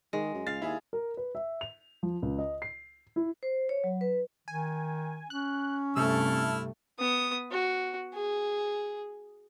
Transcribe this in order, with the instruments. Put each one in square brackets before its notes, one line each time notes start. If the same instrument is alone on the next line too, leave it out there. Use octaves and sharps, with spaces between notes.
[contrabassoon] D#3 [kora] G#3
[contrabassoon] F#2
[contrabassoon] C#2 [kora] F5 [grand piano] A6
[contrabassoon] D#2 [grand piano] E4 G#4
[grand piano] A#4
B4
E5
F7
F3
C#2
D#5
C7
E4
[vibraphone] C5
C#5
F#3
B4
[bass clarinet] D#3 [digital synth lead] G#5
[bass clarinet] C#4 [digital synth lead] F#6
[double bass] G2 A3 [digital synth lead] C3 [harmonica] E4 A4 F6
[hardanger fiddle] B3 D#6
F#4
G#4